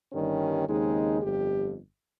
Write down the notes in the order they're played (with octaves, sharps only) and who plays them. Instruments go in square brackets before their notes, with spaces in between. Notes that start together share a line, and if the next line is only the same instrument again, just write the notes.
[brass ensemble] G1 G2 D#3 G3 C#4
D#2 C#3 G#3 C4 D#4
G1 F2 G4